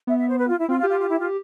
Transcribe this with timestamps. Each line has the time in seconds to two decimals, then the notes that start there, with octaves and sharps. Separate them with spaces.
0.07 B3 E5
0.17 E5
0.28 C5
0.38 B4
0.48 F4
0.58 E4
0.69 C4 F4
0.79 F4
0.83 G4
0.89 F4
0.99 F4
1.09 E4
1.19 F4